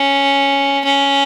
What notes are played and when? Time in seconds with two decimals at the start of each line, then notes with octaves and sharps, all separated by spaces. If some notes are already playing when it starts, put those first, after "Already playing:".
Already playing: C#4
0.85 C#4